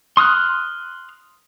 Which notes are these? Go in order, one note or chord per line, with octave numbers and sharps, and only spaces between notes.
C6 D#6 F6 F#6